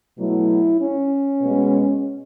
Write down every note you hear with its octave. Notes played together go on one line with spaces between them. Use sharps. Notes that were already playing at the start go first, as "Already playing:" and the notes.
B2 F#3 A3 E4
C#4
B2 G#3